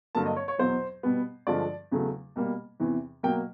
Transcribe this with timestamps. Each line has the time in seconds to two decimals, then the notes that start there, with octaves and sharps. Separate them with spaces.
0.15 G2 D3 F#3 A#3 A5
0.26 D#5
0.36 C#5
0.48 C#5
0.59 E2 B2 F#3 C5
1.03 B2 G3 B3
1.47 G2 D3 F3 G#3 D5
1.92 E2 C#3 F#3 A3
2.36 B2 G3 A#3
2.80 E2 C3 E3
3.23 B2 F#3 A#3 G5